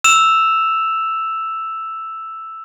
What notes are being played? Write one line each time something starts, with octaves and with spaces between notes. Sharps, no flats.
E6 E7 F7